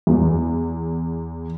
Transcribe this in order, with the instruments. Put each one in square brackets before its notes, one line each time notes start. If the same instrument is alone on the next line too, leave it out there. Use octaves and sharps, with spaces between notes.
[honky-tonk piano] E2